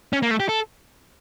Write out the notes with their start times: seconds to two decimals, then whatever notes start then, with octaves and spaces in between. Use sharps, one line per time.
0.13 C#4
0.22 A#3
0.31 A3
0.40 G4
0.49 A4